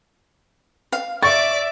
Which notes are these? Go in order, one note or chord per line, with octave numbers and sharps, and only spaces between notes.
F5
D5 E5 C#6 D6 A6